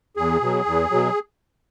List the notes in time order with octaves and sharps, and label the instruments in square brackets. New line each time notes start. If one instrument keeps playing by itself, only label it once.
[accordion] E2 G#4
B2 F#3
E2
B2 F#3